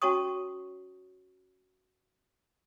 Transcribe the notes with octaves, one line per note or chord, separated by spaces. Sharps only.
C#4 F#4 C#5 A5 C#6 D#6